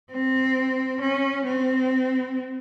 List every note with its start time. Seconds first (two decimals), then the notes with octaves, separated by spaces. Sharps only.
0.11 C4
1.01 C#4
1.46 C4